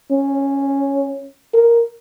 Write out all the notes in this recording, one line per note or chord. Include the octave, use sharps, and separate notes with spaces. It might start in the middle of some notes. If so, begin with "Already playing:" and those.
C#4
A#4